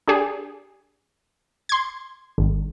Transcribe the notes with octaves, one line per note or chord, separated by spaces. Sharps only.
D4 G4 G#4
C6 G#6
G#1